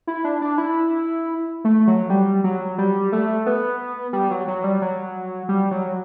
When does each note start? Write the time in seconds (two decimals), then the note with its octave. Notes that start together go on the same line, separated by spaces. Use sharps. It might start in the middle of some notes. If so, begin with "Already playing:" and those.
0.07 E4
0.24 D4
0.42 D4
0.58 E4
1.65 A3
1.87 F#3
2.10 G3
2.44 F#3
2.78 G3
3.12 A3
3.46 B3
4.13 G3
4.31 F#3
4.48 F#3
4.64 G3
4.82 F#3
5.49 G3
5.71 F#3